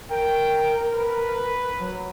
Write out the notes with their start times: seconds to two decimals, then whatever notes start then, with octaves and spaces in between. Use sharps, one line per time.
0.11 A#4 G5
0.94 B4
1.80 F#3